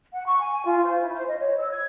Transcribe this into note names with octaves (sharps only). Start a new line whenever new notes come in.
F#5
C#6
G#5
G#5
F4
C5
E4
C5
D#5
C#5
E6
G#6